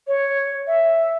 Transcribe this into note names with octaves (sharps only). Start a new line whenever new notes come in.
C#5
E5